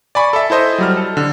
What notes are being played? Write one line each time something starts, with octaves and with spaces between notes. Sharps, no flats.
D5 G#5 B5 C#6 D6
A4 E5
E4 A4 C5 D#5
F#3 G3 F6
A4
D3